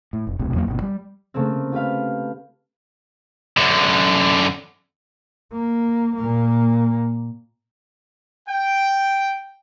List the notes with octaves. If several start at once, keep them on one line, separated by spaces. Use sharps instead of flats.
A2
F1
D#1 B1 A2 C3
E2 F#3 G3 A#3
G1 B2
G3
C#3 A3 A#3 C4
F4 G4 B4 F5
F#2 D3
A#3
A#2 A#3
G5